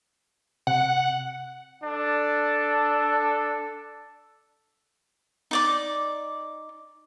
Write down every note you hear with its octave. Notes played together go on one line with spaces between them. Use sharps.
C3 F#5
D4 A4
D#4 D5 D6